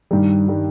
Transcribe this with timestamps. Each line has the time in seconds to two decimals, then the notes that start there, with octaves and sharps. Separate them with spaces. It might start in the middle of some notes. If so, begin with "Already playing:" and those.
0.11 G2 D#3 G3
0.48 D#3 G3